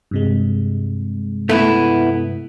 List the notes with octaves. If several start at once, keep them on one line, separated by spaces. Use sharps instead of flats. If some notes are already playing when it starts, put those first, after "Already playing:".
G2 C3 G#3
A3 B3 E4